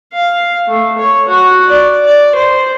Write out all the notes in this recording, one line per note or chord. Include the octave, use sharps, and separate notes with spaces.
F5
A3
C#5
F#4
D5
D5
C5